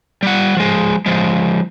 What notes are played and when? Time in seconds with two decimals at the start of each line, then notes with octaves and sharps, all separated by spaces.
0.23 G3 F#5
0.57 F3 G#3
1.06 F3 G#3